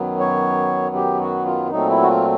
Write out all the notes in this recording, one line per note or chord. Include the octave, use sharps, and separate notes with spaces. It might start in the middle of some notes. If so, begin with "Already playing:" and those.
Already playing: F#2 D#3 F#3 B3
C#5
G4
F#4
F4
A#2 F#3 A3 C4 D#4
E4
F#4
F4